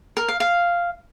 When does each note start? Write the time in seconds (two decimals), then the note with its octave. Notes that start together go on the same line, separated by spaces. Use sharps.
0.17 A#4
0.28 F5
0.40 F5